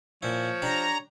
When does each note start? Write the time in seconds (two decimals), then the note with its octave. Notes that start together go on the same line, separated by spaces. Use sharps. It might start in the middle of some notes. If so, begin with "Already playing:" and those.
0.23 A#2 F3 E4 C#5
0.62 D4 G4 D5 A#5